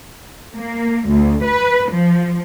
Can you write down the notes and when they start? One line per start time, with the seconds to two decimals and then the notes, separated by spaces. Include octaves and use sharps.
0.55 A#3
1.10 D2
1.44 B4
1.92 F3